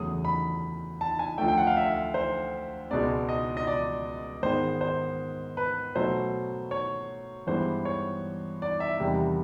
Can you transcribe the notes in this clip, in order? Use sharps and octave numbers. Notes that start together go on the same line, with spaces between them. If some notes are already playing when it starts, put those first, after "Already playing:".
Already playing: E2 C#3 F#3 A3 D#6
B5
A5
G#5
D2 D3 F3 A3 G5
G5
F#5
F5
E5
C5
C#2 B2 G#3 D5
D#5
D#5
D5
G#2 D#3 G#3 B3 C5
C5
B4
B2 F#3 A3 C5
C#5
G2 E3 G#3 B3 C5
C#5
D5
E5
E2 C3 D#3 G3